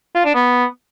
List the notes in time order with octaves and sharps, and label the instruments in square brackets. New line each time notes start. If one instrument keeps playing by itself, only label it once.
[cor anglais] F4
D4
B3